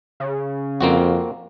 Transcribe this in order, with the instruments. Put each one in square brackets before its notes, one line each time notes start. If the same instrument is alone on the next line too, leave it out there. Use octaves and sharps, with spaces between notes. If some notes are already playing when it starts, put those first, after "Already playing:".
[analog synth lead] C#3
[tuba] F2 [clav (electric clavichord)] A#3 C4 F#4